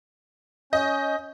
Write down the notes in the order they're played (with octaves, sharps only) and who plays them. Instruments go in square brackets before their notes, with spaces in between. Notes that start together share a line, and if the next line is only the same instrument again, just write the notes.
[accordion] C#4 G6 [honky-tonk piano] D#5